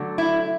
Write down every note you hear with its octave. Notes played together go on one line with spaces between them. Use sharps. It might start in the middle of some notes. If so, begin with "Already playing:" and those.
Already playing: D3 F#3 A3
E4